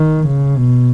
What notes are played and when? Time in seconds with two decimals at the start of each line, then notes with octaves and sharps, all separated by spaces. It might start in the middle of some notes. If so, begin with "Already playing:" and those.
Already playing: D#3
0.27 C#3
0.57 B2